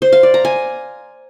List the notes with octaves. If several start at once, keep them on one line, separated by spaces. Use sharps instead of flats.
C5
F5
D5
A#5
G#5